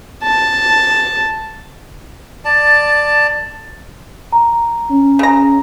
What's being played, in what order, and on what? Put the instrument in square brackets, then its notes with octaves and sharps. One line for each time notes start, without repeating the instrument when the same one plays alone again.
[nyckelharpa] A5
[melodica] D5 A5
[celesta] A#5
[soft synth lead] C#4
[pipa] C#3 A#5